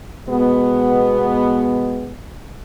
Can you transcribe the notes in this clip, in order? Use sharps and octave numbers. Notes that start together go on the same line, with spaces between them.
B2 G#3 B3